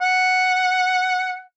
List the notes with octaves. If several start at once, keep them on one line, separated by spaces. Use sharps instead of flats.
F#5